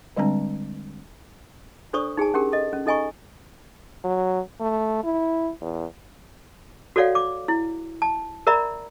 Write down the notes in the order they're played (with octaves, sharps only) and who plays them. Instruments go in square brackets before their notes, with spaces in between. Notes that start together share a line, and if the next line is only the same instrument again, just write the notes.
[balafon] D3 G3 G#3 C4 D4 A#5
[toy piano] D4 A4 C5 D5 C#6 D#6
D#4 G#4 G#5 A5
C#4 D4 G4 G#4 A#4
A4 D#5
C#4
D#4 A4 D#5 G#5 A#5 C#6
[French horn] F#3
A3
E4
E2
[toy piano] F#4 A4 C#5 D5 F5 F#5
D6
E4
A5
A#4 D5 E5 A#5 B5